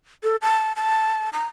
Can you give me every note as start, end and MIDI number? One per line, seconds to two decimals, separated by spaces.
0.24 0.36 69
0.42 0.73 81
0.76 1.30 81
1.33 1.45 82